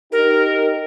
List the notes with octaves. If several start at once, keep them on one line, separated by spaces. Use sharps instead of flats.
D#4 G4 A#4